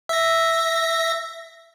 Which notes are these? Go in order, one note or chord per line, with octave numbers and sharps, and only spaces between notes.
E5 A#6